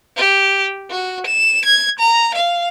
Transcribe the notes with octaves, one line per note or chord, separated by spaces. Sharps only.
G4
F#4
E7
G#6
A#5
F5